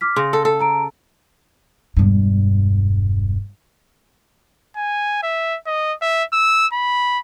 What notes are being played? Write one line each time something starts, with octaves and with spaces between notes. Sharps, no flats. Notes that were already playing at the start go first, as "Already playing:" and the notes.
D6 F6 B6
C#3 C6 A#6
A4
A4
A5 A#5 D7
E1 G2
G#5
E5
D#5
E5
E6
B5